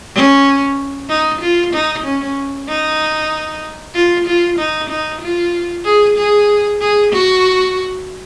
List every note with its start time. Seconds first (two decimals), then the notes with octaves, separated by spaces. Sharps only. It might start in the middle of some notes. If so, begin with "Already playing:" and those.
0.15 C#4
1.10 D#4
1.41 F4
1.74 D#4
2.04 C#4
2.69 D#4
3.95 F4
4.27 F4
4.59 D#4
4.90 D#4
5.22 F4
5.85 G#4
6.18 G#4
6.81 G#4
7.13 F#4